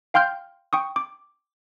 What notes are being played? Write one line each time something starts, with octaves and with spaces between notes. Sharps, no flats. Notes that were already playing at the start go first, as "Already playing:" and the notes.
F5 G5 C6 F6 G6
G5 C#6 D#6
D6